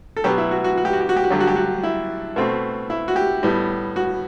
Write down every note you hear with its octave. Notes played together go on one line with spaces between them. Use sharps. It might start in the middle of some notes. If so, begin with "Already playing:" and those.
A4
B2 F#3 B3 G4
E4
F#4
F#4
F#4
G4
F#4
G4
F#4
G4
F#4
G2 D3 F#3 G4
F#4
G4
F#4
E4
B2 A3 C4
E4
F#4
G4
A2 G3 B3
F#4